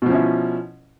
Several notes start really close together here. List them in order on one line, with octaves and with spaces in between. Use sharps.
B2 F3 C#4 E4